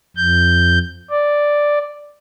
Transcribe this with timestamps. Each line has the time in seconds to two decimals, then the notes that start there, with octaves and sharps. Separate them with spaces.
0.17 F2 G6
1.10 D5